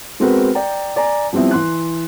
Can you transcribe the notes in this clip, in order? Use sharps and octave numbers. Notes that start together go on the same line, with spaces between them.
G#3 B3 C4 F#4 A#4 B4
D5 G5 A#5
D5 G#5 A#5
F3 G3 B3 C4 E4
E3 C6 F#6